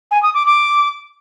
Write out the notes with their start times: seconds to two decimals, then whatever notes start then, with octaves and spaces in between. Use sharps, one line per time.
0.11 G#5
0.23 D#6
0.34 D6
0.46 D6